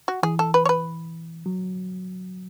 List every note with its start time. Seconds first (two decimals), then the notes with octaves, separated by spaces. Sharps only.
0.08 F#4
0.23 E3 G#4
0.39 A4
0.54 B4
0.65 C#5
0.69 B4
1.46 F#3